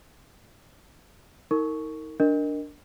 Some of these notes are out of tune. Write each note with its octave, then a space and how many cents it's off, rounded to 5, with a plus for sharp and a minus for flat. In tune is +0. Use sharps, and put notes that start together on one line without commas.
D#4 +35 A#4 -30 C#6 +5
D4 +0 A#4 +0 D#5 +0